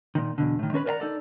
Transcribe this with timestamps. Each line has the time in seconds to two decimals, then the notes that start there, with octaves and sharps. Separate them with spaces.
0.15 A#2 D#3
0.38 E2 B2 D3
0.59 A2 D#3
0.73 D#3 C#4 A#4 B4
0.86 A#4 B4 D5 D#5 F#5 A#5
1.00 D#4 A4 D5